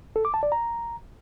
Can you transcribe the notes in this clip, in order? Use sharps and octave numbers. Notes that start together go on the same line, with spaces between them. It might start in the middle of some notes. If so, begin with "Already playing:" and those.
A4
D6
A5
D5
A#5